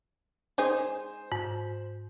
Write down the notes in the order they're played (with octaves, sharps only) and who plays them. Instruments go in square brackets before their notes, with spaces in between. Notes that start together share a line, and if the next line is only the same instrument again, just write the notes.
[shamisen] G#3 D#4 G#4 [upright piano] C5
[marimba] G#2